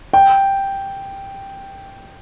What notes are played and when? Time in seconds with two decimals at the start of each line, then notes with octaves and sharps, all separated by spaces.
0.13 G5